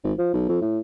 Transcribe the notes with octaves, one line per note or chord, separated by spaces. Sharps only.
G#1
F3
B1
F2
A2